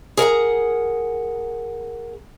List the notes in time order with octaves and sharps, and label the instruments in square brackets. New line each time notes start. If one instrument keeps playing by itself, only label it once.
[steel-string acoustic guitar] G#4 A#4 F#5 A#5